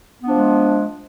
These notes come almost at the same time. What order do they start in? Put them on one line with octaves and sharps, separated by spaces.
B3 D4 F3 G#3